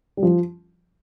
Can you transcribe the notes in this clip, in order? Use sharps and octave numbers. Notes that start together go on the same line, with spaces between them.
G3
F3